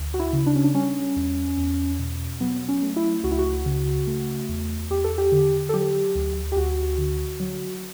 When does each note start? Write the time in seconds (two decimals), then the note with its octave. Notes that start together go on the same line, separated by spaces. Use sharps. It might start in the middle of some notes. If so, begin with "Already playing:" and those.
Already playing: D2
0.14 F#4
0.19 E4
0.33 C#3
0.46 D4
0.56 C#4
0.64 D4
0.74 G3 C#4
1.16 E2
1.58 E2
1.99 B2
2.40 F#3 B3
2.69 C#4
2.83 A3
2.96 E4
3.24 C#2 F#4
3.31 E4
3.39 F#4
3.66 C#3
4.07 A3
4.49 E2
4.90 E2 G4
5.04 A4
5.18 G4
5.32 D3
5.69 A4
5.73 F#3 G4
6.15 D2
6.52 G4
6.56 D2 F#4
6.98 D3
7.40 F#3